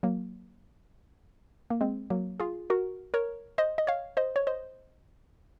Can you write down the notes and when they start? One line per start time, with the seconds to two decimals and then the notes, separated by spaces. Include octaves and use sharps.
0.03 F#3 A#3
1.70 A#3
1.81 G#3 C4
2.10 F#3 A#3
2.40 F4 G#4
2.70 F#4 A#4
3.14 A#4 C#5
3.58 C5 D#5
3.78 D#5
3.87 C#5 F5
4.17 C5 D#5
4.36 C#5
4.47 C5 D#5